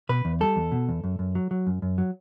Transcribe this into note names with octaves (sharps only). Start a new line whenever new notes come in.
B2 B4
E2
G3 A4
E2
B2
E2
F#2
F#2
F#3
F#3
F#2
F#2
F#3